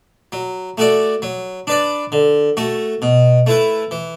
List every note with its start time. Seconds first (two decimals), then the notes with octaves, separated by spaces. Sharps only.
0.32 F#3
0.78 A3 F#4 D5
1.22 F#3
1.67 D4 B4 D5
2.12 D3
2.57 A3 F#4
3.02 B2
3.47 A3 E4 B4
3.91 E3